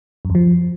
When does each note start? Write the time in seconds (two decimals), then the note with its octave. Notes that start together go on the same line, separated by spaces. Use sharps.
0.25 F#2
0.30 F2
0.35 F3